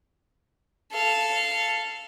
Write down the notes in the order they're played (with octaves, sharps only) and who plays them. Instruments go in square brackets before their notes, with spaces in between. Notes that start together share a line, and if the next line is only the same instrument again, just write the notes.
[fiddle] A4 F5